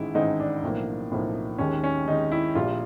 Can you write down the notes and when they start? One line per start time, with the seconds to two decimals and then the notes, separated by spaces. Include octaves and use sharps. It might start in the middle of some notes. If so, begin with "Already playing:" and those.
Already playing: A1 G#2 D#3 G#3 E4
0.14 A1 G#2 D#3 G#3 D#4
0.40 D4
0.63 B1 A2 F3 A#3
1.12 B1 A2 F3 A#3
1.58 D#2 D#3 G#3 C#4
1.84 C#4
2.07 D#2 D#3 G#3 D#4
2.32 E4
2.55 A#1 A#2 G3 F4